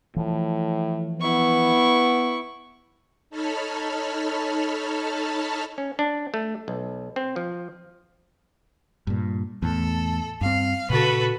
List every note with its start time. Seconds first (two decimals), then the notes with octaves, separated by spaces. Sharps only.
0.16 A2 E3 F3
1.21 B3 E4 C#6
3.30 D#4 A4 C#5 A5 B5 F6
5.78 C#4
5.99 D4
6.34 A3
6.68 B1
7.16 C4
7.36 F3
9.07 G2 A#2
9.62 E2 A2 A4
10.41 G2 C4 F5
10.90 A#2 C#3 F#4 A4 B4